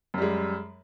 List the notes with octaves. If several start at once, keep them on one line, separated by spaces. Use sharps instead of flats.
F#2 G3 G#3